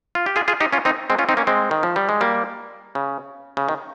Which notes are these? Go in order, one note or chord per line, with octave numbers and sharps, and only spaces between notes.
F4
G4
F4 G#4
F4 G#4
D#4 G4
C#4 F4
C4 D#4
G#3 C4
C#4 F4
C4 D#4
A#3 C#4
G#3 C4
D#3
F3
G3
G#3
G3 A#3
C#3
C#3
D#3